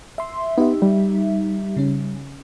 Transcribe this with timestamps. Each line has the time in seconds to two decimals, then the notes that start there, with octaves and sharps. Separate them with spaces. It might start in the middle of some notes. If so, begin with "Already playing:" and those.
0.18 E5 C6
0.58 B3 D#4 G4 E5
0.82 G3
1.77 C#3 C#4